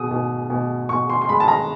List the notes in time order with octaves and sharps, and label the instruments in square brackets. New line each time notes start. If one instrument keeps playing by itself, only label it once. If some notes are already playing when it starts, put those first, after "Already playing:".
Already playing: [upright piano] B2 D#6
B2
B2
B2 C#6
C6
C6
G#3 B5
A5
A#5